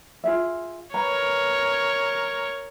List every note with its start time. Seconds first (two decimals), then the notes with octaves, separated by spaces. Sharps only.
0.24 F4 G#4 E5
0.94 A#4 B4 C#5 A#5